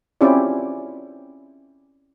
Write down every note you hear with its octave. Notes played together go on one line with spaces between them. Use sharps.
C4 C#4 E4 F4 G4 D5